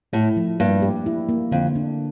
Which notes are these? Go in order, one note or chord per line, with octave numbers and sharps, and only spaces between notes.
A2 A3
F3
G2 A#3
G4
E4
A#3
F2 D3
D4